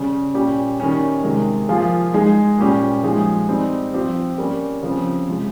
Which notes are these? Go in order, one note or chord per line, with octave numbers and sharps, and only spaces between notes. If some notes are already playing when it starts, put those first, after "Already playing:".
Already playing: C#3 G3 C#4
A#2 G3 C#4 G4
D#3 G3 C#4
C3 D#3 G#3
F3 A#3 F4 G#4
G#3 D#4 G#4
A#2 G3 C#4 G4
F3 G#3 D#4 G#4
G3 C4 D#4
F3 C4 G4
G3 A#3 C#4
C#3 F3 C4
C3 F3 G#3